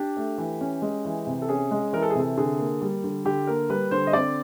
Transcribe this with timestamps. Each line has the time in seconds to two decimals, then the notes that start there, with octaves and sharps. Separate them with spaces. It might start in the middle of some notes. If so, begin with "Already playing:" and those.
Already playing: D4 G4
0.17 A3
0.38 E3
0.61 C#4
0.82 G#3
1.05 E3
1.27 C3
1.42 A4
1.49 C#4 G#4
1.71 G#3
1.93 E3 A#4
2.02 A4
2.10 G#4
2.15 C3 A4
2.38 D3 G#4
2.59 A#3
2.82 G3
3.04 D3
3.25 D3 G4
3.47 A#3 A#4
3.70 G3 B4
3.91 D3 C5
4.07 D#5
4.13 C4 D5